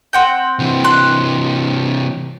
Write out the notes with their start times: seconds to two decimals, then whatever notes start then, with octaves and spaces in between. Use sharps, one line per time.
0.13 C4 F#5 G5
0.59 C3 E3
0.84 C6 F#6